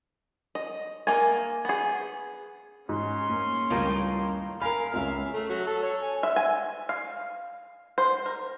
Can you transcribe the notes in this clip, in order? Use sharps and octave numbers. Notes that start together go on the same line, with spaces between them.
D#5
A#3 A#4 D#5 G#5
B3 G#4
G#2 C#4 C6
A#3
C#2 A2 D#3 G3 A#3
A#2 A#4 F5 G#5 B5
C#2 G#3 C#4 E5 F5
A3
F#3
A4
C#5
G#5
E5
G#5
F5
C5
A#4